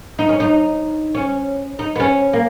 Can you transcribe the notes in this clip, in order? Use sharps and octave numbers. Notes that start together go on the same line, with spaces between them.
D#4
C#4
D#4
C#4
D#4
B3
C#4
A#3